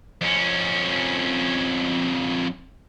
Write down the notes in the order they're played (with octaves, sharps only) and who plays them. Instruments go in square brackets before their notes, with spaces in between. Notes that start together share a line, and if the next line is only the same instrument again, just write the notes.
[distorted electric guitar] F2 C#4